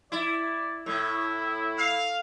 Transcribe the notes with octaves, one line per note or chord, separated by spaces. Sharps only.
E4 D5
A2 E4
F5